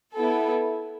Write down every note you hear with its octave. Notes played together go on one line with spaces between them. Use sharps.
B3 E4 A4